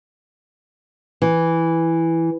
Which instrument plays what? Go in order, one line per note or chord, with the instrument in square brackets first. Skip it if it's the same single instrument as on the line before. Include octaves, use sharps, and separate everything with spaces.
[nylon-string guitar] E3